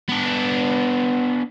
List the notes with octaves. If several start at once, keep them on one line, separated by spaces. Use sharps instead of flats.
B3 D4